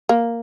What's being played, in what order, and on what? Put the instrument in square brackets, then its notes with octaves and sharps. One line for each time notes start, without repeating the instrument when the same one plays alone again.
[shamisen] A#3